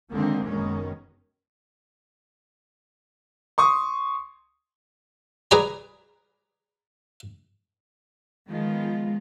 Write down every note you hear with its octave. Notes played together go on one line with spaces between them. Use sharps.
D3 D#3 F3 G#3 A#3 C4
F#1 B2 D#3 G#3 C#4
C6 C#6 D#6
G#4 B4 D5 G#5 A#5
D#3 F3 G#3 B3 F4